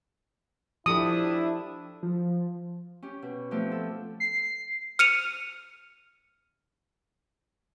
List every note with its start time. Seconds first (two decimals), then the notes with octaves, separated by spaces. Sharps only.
0.86 F3 D4 E4 G4 A4 D#6
2.03 F3
3.02 C#4 G4
3.22 B2
3.51 F3 A3 B3 C4 G4
3.72 A4
4.20 C7
4.99 F6 C#7 D#7 F7